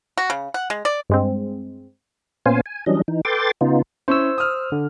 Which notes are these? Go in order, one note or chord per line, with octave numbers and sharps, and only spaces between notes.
F#4
C#3
F#5
G#3
D5
G2 G#3 C4
A#2 B3 C#4 C5 F5 G#5
G#5
E3 F#3 G3 C#4 D4 D#5
E3 D#4
A4 B4 G5 C6 D6 A6
C#3 B3 D#4 F4
C#4 E4 C5 C#6 E6
D#6 F6
D3